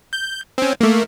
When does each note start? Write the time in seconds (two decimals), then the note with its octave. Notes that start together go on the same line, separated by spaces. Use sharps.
0.13 G6
0.58 C4 C#4
0.81 A3 A#3